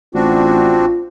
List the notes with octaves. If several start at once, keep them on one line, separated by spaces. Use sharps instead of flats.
A1 C4 D4 F4 F#4